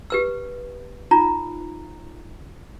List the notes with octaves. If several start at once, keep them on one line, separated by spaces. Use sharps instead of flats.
G4 B4 E6
D#4 F4 A#5